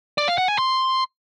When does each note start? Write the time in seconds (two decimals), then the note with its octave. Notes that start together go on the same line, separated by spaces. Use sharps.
0.18 D5
0.28 F5
0.38 F#5
0.48 G#5
0.58 C6